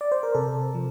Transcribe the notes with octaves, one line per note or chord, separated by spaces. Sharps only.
D5
C5
A#4
C3 A4
F3